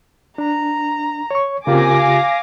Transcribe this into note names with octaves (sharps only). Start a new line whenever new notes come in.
D4 A#5
C#5 C#6
C#3 A#3 C4 F4 G4 G#5 D6 A#6
F5